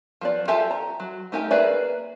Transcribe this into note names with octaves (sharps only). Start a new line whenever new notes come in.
F3 B3 D5
F4 G4 A4 E5 G#5
A#5
F#3
A3 D#4 G4 A#4 G#5
A#3 G#4 B4 D5 E5